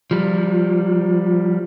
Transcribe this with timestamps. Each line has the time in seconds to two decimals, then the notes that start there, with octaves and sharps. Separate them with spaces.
0.11 F3 G3